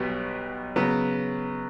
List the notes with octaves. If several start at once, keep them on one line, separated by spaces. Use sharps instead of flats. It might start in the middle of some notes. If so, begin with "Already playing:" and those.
Already playing: B1 B2 G3 B3
C#3 F#3 B3